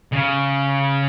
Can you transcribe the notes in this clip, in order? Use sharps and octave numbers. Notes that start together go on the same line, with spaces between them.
C#3